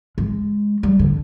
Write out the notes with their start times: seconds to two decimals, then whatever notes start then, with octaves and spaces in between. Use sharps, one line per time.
0.18 G#3
0.83 G3
0.99 D3